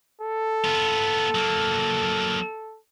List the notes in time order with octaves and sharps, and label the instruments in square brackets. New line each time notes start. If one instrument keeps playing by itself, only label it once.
[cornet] A4
[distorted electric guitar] B3 F4
F#3 A#3